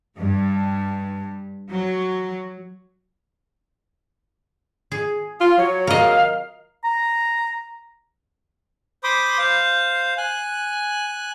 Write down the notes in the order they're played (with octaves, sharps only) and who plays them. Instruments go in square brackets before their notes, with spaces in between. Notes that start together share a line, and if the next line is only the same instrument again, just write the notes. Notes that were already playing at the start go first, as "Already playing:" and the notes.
[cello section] G2
F#3
[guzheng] G#4
[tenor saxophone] F4 [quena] F5
[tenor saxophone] F#3 [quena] C#5
[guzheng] A#4 D#5 [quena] F5
[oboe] A#5
[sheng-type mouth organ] C5 B5 C6 D6 D#6
C5 F5
G#5 F#6